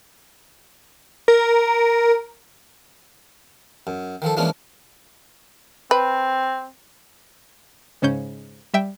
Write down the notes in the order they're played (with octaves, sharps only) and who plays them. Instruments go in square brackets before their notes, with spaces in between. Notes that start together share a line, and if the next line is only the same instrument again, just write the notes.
[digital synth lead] A#4
[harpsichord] F#2
D#3 F3 A4
E3 F3 G#3 A#3 C#4 D4
[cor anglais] C4 [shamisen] B4
[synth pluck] G#2 C#3 C#4 G6
G3 E5 G5